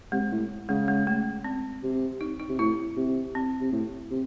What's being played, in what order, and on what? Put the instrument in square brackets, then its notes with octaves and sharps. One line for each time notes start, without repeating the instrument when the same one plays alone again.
[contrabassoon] C3 [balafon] G#3
[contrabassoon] A2
[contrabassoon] C#3 [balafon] G#3
[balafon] G#3
A3
C4
[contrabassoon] C3
[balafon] D#4
D#4
[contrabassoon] C3
[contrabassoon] A2 [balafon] E4
[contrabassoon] C3
[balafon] C4
[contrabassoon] C3
A2
C3